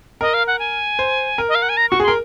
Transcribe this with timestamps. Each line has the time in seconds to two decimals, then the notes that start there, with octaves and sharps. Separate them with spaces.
0.21 A#4 D#5
0.34 F5
0.47 F#5
0.59 G#5
0.99 C5
1.38 A#4
1.48 D#5
1.55 F5
1.62 F#5
1.69 G#5
1.77 A#5
1.90 F#4 C#6
2.00 G#4
2.03 C6
2.08 A#4